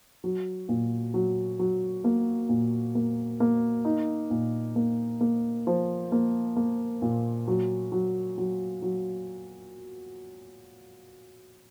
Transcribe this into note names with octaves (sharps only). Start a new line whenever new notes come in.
F#3
A#2
F#3
F#3
A#3
A#2
A#3
A#3
D#4
A#2
A#3
A#3
F3
A#3
A#3
A#2
F#3
F#3
F#3
F#3